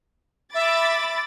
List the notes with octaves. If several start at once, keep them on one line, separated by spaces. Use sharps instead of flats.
E5 B5 D6 A6